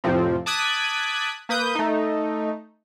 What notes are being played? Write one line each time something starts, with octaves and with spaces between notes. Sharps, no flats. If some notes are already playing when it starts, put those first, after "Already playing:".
F2 A2 C3 F3 C4
A5 D6 D#6 F#6 G#6 B6
A#3 B4 D#6 G6
A3 D#4